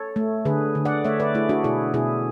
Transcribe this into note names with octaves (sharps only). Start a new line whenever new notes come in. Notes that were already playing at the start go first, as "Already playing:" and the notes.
Already playing: A4 C#5
A3
D3 G#4 B4
D3
D5 F#5
A3 C#5 E5
B4 D5
A3 E4 G#4
D4 F#4
B2 E4 G#4
B2 E4 G#4